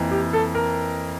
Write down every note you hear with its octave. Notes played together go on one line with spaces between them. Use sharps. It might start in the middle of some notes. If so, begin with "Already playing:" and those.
Already playing: F2 E3 A#3
G4
A4
A#4